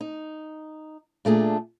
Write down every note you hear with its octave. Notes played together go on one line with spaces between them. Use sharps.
D#4
A#2 A3 D4 G#4